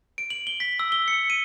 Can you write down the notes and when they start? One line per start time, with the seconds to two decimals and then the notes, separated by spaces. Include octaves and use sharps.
0.18 D7
0.30 F#7
0.47 G7
0.60 B6
0.79 E6
0.92 G7
1.08 C#7
1.30 D#7